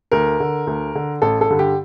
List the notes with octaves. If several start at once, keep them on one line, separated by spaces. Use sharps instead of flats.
D2 A#4
D3
D2
D3
A1 A4
A4
G2 D3
G4